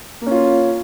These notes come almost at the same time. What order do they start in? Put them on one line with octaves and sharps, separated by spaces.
A#3 C#4 F4